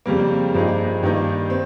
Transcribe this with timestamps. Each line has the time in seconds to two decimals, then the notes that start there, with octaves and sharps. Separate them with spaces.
0.06 F2 C#3 G3 A#3
0.54 G2 F3 A#3 D#4 G#4
1.03 G2 D#3 A#3 D#4
1.50 C4